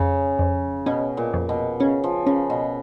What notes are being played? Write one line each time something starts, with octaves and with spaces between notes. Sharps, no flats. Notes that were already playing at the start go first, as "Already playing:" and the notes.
Already playing: F2 C#3
F2
B2 C#4
A#2
F2
B2
C#3 C#4
F3
C#3 C#4
B2